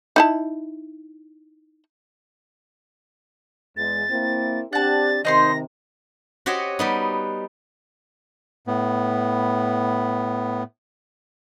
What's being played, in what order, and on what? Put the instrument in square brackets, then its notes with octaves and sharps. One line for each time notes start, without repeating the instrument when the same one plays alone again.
[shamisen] D#4 E4 A5
[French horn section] E2 G#3 [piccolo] A6
[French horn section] A#3 C4 E4
[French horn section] C4 D4 G4 [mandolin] F#5 A5 [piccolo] A6
[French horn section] C3 D#3 [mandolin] D#4 C5 C6 [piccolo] A#6
[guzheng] F#4 G4 C5 C#5 D#5
G3 B3 D#4
[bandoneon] A2 B3